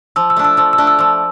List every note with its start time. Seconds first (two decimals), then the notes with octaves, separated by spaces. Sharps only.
0.16 F3 E6
0.30 E6
0.37 A3 D4
0.44 E6
0.57 F3 E6
0.73 E6
0.78 A3 D4
0.87 E6
0.99 F3 E6